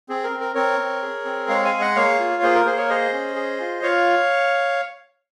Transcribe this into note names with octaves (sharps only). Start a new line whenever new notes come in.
C4 G#4
A#4
C4
A#4
C4 A#4 C#5
C4
G#4
C4
G#3 C#5 F5
F5 G#5
G#4
D#5 F#5
A#3 C#5 F5
F4
A#3 G#4 C5
A#4
A#3 G#4 C5
A#4 C#5
G#4 C5 D#5
C#4
G#4
F4
F4 C#5 F5